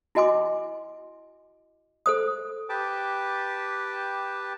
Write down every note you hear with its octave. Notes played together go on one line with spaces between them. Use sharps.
E4 F#4 D#5 G#5 C6 D6
A4 C5 D#6
G4 B4 G5 A5 D6